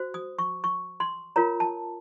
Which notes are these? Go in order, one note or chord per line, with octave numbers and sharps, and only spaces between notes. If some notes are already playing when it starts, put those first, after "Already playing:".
Already playing: F#4 C5
D#6
C#6
C#6
C6
F4 A#4 C#5 A#5
A5